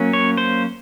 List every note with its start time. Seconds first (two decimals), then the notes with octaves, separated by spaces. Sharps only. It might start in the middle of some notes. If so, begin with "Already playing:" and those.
Already playing: F#3 A#3 C#4
0.13 C#5
0.38 C5